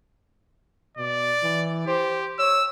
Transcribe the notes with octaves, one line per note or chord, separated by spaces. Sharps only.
B2 D5
E3
G4 C5
C#5 E6